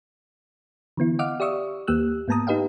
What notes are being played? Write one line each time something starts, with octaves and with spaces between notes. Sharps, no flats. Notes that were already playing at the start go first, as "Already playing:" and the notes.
D3 E3 B3 E4
D#5 F5 F#5 D6 F6
G4 D5 E5 C#6 D#6 E6
D#2 A#3 G4 E6 F#6
G#2 A#3 B3 A5 A#5 D#6
D#4 G4 B4 D#5 F5 G5